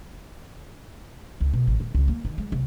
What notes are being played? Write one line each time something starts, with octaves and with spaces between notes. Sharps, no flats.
C#2
B2
A1
D#1
C#2
A#3
D#3
G#3
C2